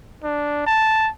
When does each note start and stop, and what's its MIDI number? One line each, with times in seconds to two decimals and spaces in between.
0.24 0.64 62
0.66 1.10 81